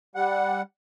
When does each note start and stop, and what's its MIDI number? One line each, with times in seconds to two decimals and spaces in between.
0.15 0.62 55
0.15 0.62 78